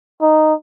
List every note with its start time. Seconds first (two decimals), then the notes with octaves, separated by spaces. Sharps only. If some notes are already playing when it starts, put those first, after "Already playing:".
0.22 D#4